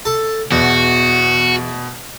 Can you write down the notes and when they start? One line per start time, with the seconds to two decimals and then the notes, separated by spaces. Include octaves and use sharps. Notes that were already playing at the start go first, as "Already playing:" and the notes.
0.05 A4
0.52 E2 B2 F#4